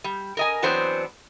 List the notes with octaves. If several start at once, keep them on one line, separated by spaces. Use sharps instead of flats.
G3
A#4 D#5 G#5
E3 F#3 B3 C4 D4 C5